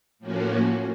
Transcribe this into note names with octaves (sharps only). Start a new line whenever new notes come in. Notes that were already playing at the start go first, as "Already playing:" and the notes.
A2 F3 A#3 C#4 F#4